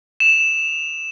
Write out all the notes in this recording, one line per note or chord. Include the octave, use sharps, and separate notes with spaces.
E7 F7